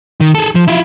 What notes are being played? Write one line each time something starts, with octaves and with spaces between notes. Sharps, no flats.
D#3
G#4 A4
F3
E4 F4